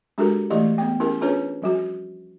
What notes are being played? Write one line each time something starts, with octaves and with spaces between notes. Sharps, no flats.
G#3 D4 F#4 G4 A4 A#4
E3 A3 E4 G4 D5 D#5
B3 G5
C#4 E4 G4 G#4 A#4
C#4 D4 F4 G#4 B4 C#5
F3 G3 F#4